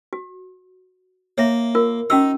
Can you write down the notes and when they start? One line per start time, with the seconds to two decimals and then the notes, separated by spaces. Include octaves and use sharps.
0.13 F#4
1.38 A#3 C#5 E5
1.75 F4 A#4
2.10 C#4 D#4 F#4 E6